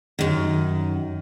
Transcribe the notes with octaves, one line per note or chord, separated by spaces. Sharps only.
F#2 D#3